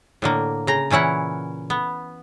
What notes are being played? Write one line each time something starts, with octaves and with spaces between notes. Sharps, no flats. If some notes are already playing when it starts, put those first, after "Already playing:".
A2 D3 A#3
C#3 A#5
A#2 E3 C#4 E4 F#5
B3